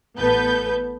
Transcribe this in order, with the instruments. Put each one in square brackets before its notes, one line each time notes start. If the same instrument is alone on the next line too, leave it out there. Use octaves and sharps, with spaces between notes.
[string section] A1 B3 A4 B4 G6